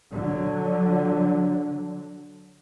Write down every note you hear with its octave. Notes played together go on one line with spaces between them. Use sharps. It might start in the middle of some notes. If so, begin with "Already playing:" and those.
D3 F#3